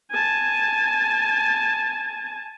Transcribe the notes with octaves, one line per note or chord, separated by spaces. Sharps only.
G#5 A5